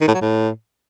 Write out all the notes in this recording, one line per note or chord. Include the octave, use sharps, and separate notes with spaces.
D#3
A2
F#3
A2